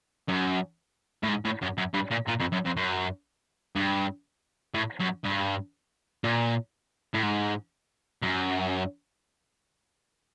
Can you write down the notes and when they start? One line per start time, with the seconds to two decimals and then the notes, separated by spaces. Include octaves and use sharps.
0.29 F#2
1.23 A2
1.28 G#2
1.45 A2
1.62 F#2
1.78 F#2
1.94 G2
2.11 A#2
2.27 A#2
2.40 F2
2.52 F#2
2.65 F2
2.77 F#2
3.76 G2
4.74 A2
5.00 F#2
5.25 G2
6.24 A#2
7.14 A2
7.23 G#2
8.22 F#2